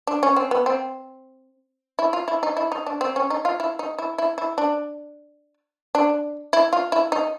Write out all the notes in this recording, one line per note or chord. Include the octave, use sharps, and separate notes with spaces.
D4
C#4
C4
B3
C4
E4
F4
E4
D#4
E4
D#4
D4
C4
C#4
D#4
F4
E4
D#4
E4
E4
E4
D4
D4
E4
F4
E4
D#4